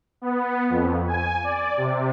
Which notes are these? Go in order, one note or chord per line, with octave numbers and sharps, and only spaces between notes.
B3
F2
G#5
D5
C3